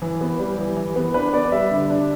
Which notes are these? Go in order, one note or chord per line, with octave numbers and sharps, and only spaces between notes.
E3
B3
G3
E3
E3
B3
D4 B4
B3 D5
G3 E5
D3
D4